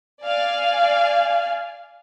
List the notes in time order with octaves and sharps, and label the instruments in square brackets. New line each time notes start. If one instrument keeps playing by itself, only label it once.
[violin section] D5 F5 G#5